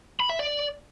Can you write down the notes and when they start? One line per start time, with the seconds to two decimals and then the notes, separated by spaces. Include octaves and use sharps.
0.20 B5
0.30 E5
0.39 D5